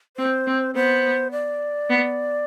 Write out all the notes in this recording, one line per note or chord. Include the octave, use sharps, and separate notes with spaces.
C4 C5
C4
B3 C5
D5
B3